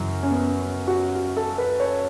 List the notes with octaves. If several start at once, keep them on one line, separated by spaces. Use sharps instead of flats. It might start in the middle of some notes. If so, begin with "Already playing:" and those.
Already playing: F#2 C#3 E3
C#4
B3
F#4
F#4
A4
B4
C#5